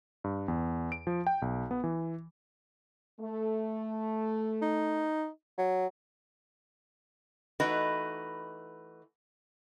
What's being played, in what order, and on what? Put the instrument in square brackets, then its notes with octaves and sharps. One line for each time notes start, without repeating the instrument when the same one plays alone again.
[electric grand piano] G2
E2
D7
F3
G5
B1
B3
E3
[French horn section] A3
[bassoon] D#4
F#3
[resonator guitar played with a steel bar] E3 A3 D#4 F#4 B4